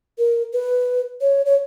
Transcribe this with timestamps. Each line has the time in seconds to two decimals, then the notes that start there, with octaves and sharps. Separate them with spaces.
0.18 A#4
0.53 B4
1.21 C#5
1.46 C#5